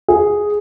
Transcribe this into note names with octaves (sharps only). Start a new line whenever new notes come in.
G#4